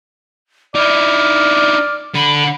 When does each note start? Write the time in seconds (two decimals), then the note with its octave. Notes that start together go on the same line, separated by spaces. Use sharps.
0.75 D#4 E4 D5 F6
2.14 D3 B5